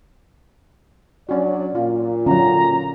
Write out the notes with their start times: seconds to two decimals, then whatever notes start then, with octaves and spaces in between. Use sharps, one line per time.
1.29 F#3 C#4 D4 F#4 D5
1.75 A#2 F4
2.26 D3 F#3 C#4 A#5